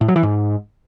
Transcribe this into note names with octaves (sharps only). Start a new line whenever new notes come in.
A2
F#3
E3
G#2